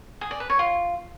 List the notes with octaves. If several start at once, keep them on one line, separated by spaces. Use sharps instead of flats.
G#4
D5
B4
C#5
F4